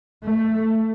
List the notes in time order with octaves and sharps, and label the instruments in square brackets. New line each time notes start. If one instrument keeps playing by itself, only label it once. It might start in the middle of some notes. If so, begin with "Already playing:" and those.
[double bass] A3